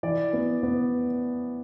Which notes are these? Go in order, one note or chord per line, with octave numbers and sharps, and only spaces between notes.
E3 D5
B3
B3